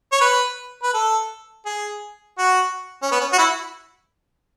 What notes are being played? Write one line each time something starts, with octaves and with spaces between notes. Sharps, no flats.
C#5
B4
B4
A4
G#4
F#4
C#4
B3
C#4
F#4
E4